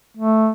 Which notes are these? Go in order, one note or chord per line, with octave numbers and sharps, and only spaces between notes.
A3